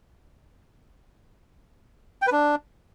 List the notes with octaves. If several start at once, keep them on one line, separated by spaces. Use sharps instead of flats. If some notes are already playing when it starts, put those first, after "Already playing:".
G5
B4
D4